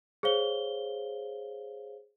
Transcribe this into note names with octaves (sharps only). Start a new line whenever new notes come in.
G#4 C5 C#5 F5 G7